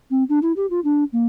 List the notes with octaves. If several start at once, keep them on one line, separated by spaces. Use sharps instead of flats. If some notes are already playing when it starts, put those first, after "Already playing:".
C4
D4
E4
G4
F4
D4
A#3